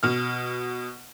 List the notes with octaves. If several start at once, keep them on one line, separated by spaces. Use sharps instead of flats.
B2 F6